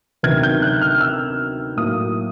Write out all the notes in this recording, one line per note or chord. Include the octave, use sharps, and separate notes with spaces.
D2 C3 D#3 F#3 B3 G#6
G6
F#6
F6
E6
A2 F#3 A#3 D#6